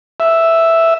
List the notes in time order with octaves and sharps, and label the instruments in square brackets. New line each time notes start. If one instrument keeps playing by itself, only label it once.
[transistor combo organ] E5